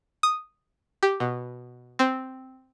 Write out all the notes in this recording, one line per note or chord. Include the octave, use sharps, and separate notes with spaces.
D#6
G4
B2
C4